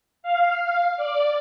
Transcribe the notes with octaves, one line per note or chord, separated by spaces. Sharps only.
F5
D5